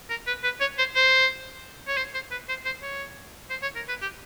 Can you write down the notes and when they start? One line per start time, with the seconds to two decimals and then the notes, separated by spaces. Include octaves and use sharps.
0.10 A#4
0.27 B4
0.44 B4
0.60 C#5
0.78 C5
0.96 C5
1.88 C#5
1.97 C5
2.14 C5
2.31 B4
2.48 C5
2.65 C5
2.82 C#5
3.50 C5
3.62 C#5
3.76 A#4
3.89 B4
4.02 G4